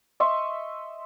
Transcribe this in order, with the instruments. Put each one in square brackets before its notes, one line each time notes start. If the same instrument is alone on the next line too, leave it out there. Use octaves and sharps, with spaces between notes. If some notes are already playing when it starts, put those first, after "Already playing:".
[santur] D#5 E5 C6 C#6